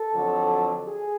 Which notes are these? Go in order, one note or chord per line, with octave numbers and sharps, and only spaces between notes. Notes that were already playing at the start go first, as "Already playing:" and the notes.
Already playing: A4
F2 D3 F#3
G#4